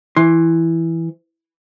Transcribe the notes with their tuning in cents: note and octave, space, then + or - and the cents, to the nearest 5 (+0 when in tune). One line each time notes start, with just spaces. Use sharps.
E3 +0 C6 +20